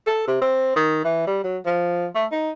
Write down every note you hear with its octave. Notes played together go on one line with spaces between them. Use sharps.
A4
C3
C4
D#3
E3
G3
F#3
F3
A3
D#4